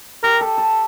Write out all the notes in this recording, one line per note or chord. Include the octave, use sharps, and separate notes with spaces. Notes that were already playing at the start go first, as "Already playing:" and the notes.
G4 A#4
A4
A4